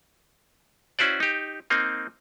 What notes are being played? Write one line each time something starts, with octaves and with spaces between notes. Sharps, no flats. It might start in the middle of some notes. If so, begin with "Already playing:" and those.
C#4 E4 F#4 C5 D5
D#4 G4
A#3 C4 D#4